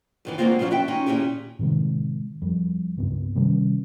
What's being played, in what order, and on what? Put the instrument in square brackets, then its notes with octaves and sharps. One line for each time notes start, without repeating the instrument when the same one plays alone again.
[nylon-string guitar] F#2 D#3 E3
D3 F#3 G#3 A#3 C4 F4
B2 F3 F#3 C#4 F4
E2 F#4 E5 G5
C#4 D#4 F4
D#2 A#2 C#4 E4 G4 G#4
[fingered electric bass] A2 C3 D#3 G#3
F2 G3
C#2 G2 C#3 B3
C3 D#3 G3 C#4